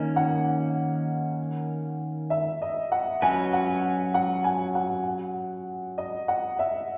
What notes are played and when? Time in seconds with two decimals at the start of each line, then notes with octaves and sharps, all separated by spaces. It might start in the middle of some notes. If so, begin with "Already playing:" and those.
Already playing: D#3 A#3 C#4 D#5
0.16 F#5
2.30 E5
2.62 D#5
2.92 F#5
3.22 F#3 C#4 F#4 B4 G#5
3.53 F#5
4.14 F#5
4.44 G#5
4.75 F#5
5.98 D#5
6.28 F#5
6.59 E5